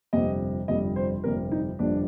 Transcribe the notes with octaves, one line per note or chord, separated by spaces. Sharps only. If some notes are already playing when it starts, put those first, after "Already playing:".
G1 F2 C3 G3 D#5
G1 F2 C3 G3 D#5
C5
G1 F2 C3 G3 A#4
D#4
G1 F2 C3 G3 D4